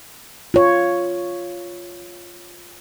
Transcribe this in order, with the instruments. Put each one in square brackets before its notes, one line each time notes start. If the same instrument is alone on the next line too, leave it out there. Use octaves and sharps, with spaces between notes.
[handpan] F4 C#5